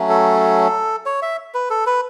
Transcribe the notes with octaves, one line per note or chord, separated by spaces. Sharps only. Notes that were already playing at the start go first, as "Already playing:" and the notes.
Already playing: F#3 A3 C#4
A4
C#5
E5
B4
A4
B4